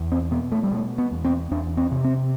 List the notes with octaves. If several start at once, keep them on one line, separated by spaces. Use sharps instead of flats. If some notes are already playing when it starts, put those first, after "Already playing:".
Already playing: E2
C4
B2 B3
A3
G3
B2 A3
B3
E2
C4
E2 D4
C4
C3
C4